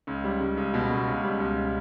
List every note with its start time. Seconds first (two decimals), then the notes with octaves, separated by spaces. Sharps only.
0.07 C#2
0.24 G3
0.40 C#2
0.57 C#2
0.74 B2
0.90 C#2
1.07 C#2
1.24 G3
1.40 C#2